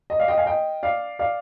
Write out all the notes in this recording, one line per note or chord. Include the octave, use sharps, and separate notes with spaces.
D#5
D5 F5
D#5 G5
F5 G#5
D#5 G5
D5 F5
D5 F5